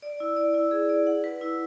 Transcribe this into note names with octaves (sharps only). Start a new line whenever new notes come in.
D5
E4
D5
E4
G#4
D5
F#5
B4
E4